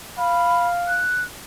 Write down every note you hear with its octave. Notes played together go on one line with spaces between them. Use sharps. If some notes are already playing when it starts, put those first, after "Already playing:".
F5 B5
F#6